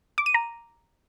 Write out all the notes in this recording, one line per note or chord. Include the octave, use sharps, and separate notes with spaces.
D6
D#7
A#5